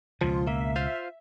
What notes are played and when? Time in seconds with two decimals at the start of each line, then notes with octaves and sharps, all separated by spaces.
0.21 C#2 B2 F3 F4
0.47 A#3 E5
0.76 F4 C5 F5